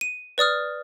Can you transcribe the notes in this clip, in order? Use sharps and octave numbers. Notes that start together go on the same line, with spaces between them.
D#7
B4 D5 D#6 F6